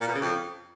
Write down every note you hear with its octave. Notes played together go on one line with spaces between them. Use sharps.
A#2
B2
C#3
F2